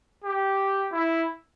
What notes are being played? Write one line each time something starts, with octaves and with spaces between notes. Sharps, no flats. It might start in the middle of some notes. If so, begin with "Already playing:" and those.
G4
E4